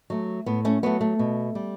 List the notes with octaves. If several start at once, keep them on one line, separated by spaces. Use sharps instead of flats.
F#3 A3
A2 B3
A3 C#4
F#3 A3 B3
A3
B2
G3